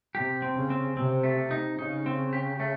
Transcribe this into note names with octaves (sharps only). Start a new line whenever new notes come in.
C3 G4
C4
C#3
C4
C3 C4
A3
D#4
C#3 D#4
C4
G4
A3